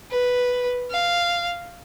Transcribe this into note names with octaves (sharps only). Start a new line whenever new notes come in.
B4
F5